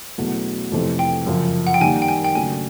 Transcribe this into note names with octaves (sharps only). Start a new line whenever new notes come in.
E2 B2 F#3 A3 C#4
F2 C3 E3 A3 C4
G5
F#2 C#3 F3
F#5
G5
D#3 G3 A#3 G#5
G5
G#5
G5
C#3 F#3 A3 D4 G#5